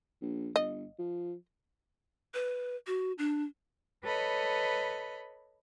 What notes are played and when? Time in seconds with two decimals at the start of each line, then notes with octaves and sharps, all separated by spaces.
0.21 A#1
0.56 G1 D#5
0.99 F3
2.34 B4
2.87 F#4
3.18 D4
4.03 A4 B4 C#5 D#5 B5